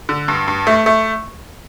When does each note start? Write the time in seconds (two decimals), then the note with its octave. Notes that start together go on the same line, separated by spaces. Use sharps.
0.09 D3
0.28 G2
0.48 G2
0.67 A3
0.86 A3